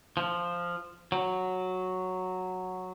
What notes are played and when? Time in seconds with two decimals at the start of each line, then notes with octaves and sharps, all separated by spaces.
0.17 F3
1.12 F#3